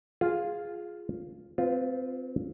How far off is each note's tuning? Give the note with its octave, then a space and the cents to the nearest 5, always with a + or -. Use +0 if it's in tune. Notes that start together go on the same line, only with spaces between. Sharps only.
F4 +0 G#4 +0
C4 -15 F4 +0 B4 +15